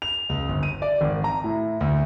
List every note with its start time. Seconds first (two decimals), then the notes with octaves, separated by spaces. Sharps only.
0.02 F7
0.29 C#2
0.49 G1
0.63 D#7
0.82 D5
1.01 G#1
1.24 A#5
1.44 A2
1.81 D2